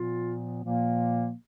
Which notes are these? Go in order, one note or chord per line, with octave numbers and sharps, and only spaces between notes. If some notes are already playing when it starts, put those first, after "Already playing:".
Already playing: A#2 F3 B3 F4
A#2 F3 A#3